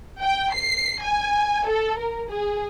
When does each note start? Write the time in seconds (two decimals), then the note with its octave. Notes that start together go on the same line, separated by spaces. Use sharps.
0.22 G5
0.53 C7
1.03 G#5
1.67 A4
1.98 A#4
2.30 G#4